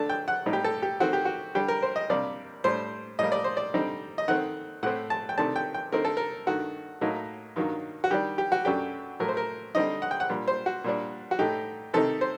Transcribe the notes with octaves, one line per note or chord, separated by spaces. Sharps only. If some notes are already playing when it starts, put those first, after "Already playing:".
Already playing: D3 A3 D4 A5
G5
F#5
A2 G3 C4 D#4
G4
A4
G4
D#3 A3 C4 F#4
G4
F#4
D3 G3 D4 G4
A#4
C5
D#5
C3 G3 A#3 D4 D5
A2 G3 D4 C5
A2 G3 A#3 D#5
D5
C5
D5
D3 G3 C4 D#4
D#5
D#3 A3 C4 F#5
A2 A3 C4 F#5
A5
G5
C3 D#3 A3 D4 A5
G5
G5
D3 A3 C4 D#4 A#4
A4
A#4
G2 D#3 A3 F#4
A2 F#3 A#3 D#4
G2 D#3 F#3 A#3
F#4
D#3 G3 D4 G4
G4
F#4
F#2 F#3 A3 D4 G4
A2 F#3 A3 A#4
C5
A#4
D3 G3 C4 D#4 D#5
F#5
G5
F#5
A#2 G3 D4
C5
F#4
A#2 G3 D4
F#4
A2 A3 D#4 G4
C3 D#3 A3 C4 D#4 A4
C5